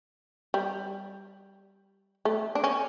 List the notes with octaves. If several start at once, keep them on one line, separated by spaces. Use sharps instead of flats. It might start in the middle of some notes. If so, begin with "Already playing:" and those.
G3
A3
D4
C#4